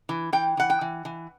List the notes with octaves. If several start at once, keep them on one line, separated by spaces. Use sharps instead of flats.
E3
E3 G5
E3 F#5
G5
E3
E3